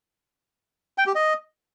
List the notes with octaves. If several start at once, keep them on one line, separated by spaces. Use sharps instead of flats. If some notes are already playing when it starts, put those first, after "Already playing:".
G5
G4
D#5